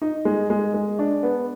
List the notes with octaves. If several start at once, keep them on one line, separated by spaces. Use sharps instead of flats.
D#4
G#3
G#3
G#3
D4
B3